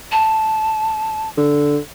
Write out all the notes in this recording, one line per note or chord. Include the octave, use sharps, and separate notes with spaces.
A5
D3